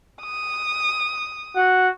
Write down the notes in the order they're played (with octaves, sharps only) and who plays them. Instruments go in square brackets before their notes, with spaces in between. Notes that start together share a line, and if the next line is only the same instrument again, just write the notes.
[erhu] D#6
[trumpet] F#4